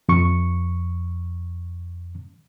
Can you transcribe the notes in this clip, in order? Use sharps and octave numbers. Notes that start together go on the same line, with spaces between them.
F2 C#6